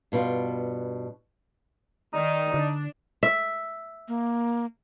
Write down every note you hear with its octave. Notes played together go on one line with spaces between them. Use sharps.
G2 B2 G3 F4
D#3 D#4 D5
D3 D4
E5
A#3